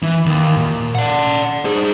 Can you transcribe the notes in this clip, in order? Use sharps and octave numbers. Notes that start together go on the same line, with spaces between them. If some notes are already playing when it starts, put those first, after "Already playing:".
E3
D#2
A#2
D5 F#5
G#4 C5